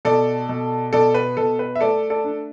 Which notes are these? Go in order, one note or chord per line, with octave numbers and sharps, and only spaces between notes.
B2 A4 D5
B2
B2 A4 D5
B4
B2 A4
B4
E5
A3 A4 D5
A4 D5
D4